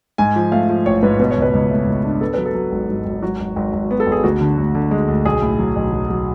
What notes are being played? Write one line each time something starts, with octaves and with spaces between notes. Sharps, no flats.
G#2 G#5
F3
A3 F5
F3
A1 C#5
G#2 B4
B2 B4
C#5
C#2
B4
C#2
A3
C#2
D4
B3 A4
F#3 B4
A4
F#3
G#1
G#2
G#1
F#3 F#4
G#1
G#1
G#1
B3
A4
G#1
G#4
D2 F#4
D3
D2
D3
G#3
D2
B1 G#4
A2
F#3
B1
F#3
F#3